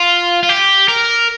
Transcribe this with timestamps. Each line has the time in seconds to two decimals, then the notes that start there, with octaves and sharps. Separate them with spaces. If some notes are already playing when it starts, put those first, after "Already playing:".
Already playing: F4
0.43 F4
0.49 G4
0.88 A#4